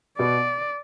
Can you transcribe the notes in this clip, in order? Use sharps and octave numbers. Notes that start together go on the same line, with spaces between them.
B2 B3 D5